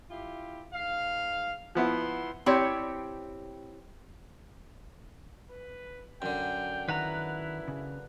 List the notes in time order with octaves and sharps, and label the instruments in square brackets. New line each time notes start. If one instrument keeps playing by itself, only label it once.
[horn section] E4 F4 G4
G#2 F5
[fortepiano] F3 B3 E4 [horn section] B4 F#5 C6
[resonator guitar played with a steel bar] C4 E4 G4 C#5 D5
[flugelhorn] B4
[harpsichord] F#2 D3 [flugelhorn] G5
[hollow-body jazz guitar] D#3 [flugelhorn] E4 [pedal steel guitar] B4 F#5 A#5
[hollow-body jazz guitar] C#3